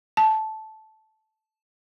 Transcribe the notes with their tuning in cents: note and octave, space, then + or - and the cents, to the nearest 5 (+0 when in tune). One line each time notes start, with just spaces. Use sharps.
A5 -10